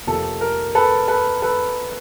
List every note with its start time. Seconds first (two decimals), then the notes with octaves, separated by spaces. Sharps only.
0.07 F2 C3 F3 A#3 A4
0.41 A#4
0.75 A4 B4
1.08 A4 B4
1.42 A4 B4